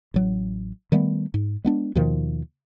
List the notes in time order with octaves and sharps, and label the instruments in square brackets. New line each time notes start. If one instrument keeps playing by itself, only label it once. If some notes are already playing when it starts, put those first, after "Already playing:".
[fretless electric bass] A1 F#3
D#3 G3 A3 B3
G#2
G#3 B3 D4
D#2 B2 D#3 F3